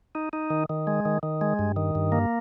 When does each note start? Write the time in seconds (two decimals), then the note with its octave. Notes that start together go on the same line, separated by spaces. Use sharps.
0.15 D#4
0.33 D#4
0.50 D#3
0.69 D#3
0.87 G#3
1.05 D#3
1.23 D#3
1.41 G#3
1.59 G2
1.76 D#3
1.95 G2
2.12 A#3